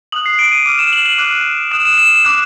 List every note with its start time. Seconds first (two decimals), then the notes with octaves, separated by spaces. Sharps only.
0.12 D#6 F#6 F#7
0.26 C7
0.39 D7
0.52 D#7
0.66 D6 F6 D#7
0.79 E7
0.93 F#7
1.06 F#7
1.18 D6 F#6
1.71 D#6 F#6 E7
1.85 E7
1.98 E7
2.25 D6 F#6